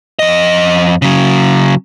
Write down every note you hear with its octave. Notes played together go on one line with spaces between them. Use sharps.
F2 D#5
C#3 F#3